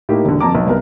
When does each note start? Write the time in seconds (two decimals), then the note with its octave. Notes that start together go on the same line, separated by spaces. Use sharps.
0.09 A2 A#3 D#4 G4
0.25 E1 D3
0.40 F2 A5 A#5 D6
0.55 B1
0.67 C2 B3 A#4